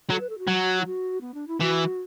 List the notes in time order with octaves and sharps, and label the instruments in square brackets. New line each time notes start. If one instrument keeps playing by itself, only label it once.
[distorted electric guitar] F#3 [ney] A4
[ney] B4
A4
F#4
[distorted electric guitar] F#3
[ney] E4
F#4
B3
D4
E4
[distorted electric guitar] E3 [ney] F#4